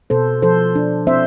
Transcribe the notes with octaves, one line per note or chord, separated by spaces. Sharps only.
B2 A4 C5
F3 A4 C5
D4
C4 C5 E5